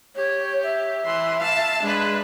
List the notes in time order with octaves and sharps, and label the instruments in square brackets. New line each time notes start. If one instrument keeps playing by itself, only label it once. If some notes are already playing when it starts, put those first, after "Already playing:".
[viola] G4 [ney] C#5
[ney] E5
[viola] E3 C6
F5 A5
[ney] G#3 [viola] D4 B4